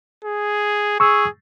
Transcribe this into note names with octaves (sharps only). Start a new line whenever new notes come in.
G#4
G#4 C#6 E6